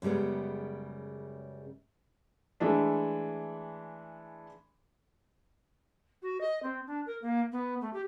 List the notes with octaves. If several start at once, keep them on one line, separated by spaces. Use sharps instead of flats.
F#2 C#3 G3 G#3 B3
E3 G#3 A3 D4
F#4
D#5
C4
D4
A#4
A#3
B3
A3
G4